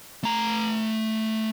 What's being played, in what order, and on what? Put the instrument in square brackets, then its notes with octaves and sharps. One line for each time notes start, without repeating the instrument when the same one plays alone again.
[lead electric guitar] A3 A#5